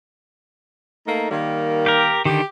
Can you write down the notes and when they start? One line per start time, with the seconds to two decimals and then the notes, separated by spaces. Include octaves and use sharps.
1.07 A3 A#3 D#4
1.31 D#3 G3 A#3
1.86 G4 A#4
2.25 D3 D#3 G4